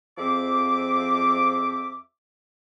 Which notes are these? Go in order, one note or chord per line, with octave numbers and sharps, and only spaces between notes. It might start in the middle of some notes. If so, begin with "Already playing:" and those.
F2 F3 C4 G#4 E5 D6